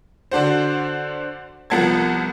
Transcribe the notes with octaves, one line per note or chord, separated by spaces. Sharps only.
D3 D4 F#4 C5
C2 F3 B3 A5 G#6